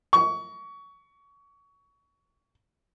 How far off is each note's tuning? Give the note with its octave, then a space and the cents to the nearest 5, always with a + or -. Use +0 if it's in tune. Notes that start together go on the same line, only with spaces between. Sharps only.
C#6 +25